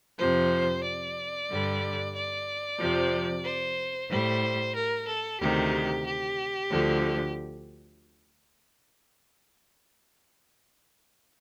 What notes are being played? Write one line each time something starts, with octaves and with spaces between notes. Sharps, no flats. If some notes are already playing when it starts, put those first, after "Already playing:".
F2 C3 F3 C5
D5
G2 D3 G3
D5
F2 C3 F3
C5
A2 G3 C5
A#4
A4
D2 C3 D#3 G4
G4
D2 D3 F3